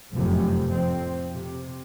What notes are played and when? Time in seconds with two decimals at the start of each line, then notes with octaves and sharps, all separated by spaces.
0.14 F1 F#2 A2 C3
0.70 F2 C4
1.32 C3